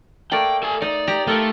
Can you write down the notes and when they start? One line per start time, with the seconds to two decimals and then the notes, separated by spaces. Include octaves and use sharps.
0.32 A3 A#3 D5 G5
0.63 A4 G#5
0.82 D#4 D5
1.07 G4 A#5
1.27 A3 F4 A4 A#4